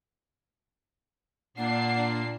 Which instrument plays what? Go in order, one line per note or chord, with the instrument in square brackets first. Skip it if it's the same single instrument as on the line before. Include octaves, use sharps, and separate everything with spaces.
[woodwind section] A#2 [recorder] A#3 [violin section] D4 C7 [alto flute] F#5